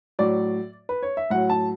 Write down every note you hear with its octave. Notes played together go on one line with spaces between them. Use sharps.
A2 F#3 D5
B4
C#5
E5
A2 F#3 F#5
A5